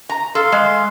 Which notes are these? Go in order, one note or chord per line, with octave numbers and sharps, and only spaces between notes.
A#5
A4 F5 C6
G#3